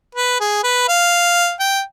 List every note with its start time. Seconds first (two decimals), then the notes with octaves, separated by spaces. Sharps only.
0.15 B4
0.40 G#4
0.63 B4
0.88 F5
1.60 G5